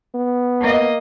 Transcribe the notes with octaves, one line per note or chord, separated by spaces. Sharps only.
B3
A#3 D#5